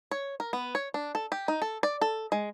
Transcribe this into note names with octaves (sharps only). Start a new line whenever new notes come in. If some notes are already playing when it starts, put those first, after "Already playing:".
C#5
A#4
B3
C#5
D4
A4
G4
D#4
A4
D5
A4
G#3